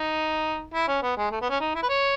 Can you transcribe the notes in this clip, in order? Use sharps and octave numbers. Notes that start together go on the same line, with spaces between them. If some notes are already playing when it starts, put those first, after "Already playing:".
Already playing: D#4
E4
C#4
B3
G#3
A3
B3
C#4
D#4
E4
B4
C#5